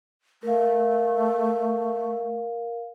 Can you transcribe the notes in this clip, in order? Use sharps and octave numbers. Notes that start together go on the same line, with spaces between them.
A3 A#4 F5